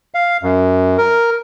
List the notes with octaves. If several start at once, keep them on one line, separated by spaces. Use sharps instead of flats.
F5
F#2
A#4